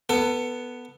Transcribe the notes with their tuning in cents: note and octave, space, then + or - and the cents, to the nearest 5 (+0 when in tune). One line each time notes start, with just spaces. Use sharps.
B3 +0 A4 +25